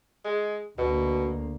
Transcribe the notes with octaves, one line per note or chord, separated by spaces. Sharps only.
G#3
D2 B2 A#3